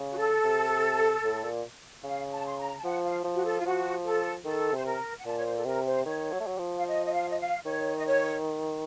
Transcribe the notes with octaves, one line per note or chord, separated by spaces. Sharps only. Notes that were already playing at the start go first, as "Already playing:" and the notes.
Already playing: C#3
F#4
A4
C3
A2
A#2
C#3 F5
A5
C6
A#5
A5
F3 F#5
F5
F3
F#4
A4
F4
F3 F#4
A4
D#3 A4
C3 C5
A#4
F#5
A#2 A5
C#5
C5
A4
C3 A#4
C5
D#3 C#5
F#3
A3
F#3
F3
F5
D#5
D#5
F5
D#5
F5
D#3 C#5
D#5
C#5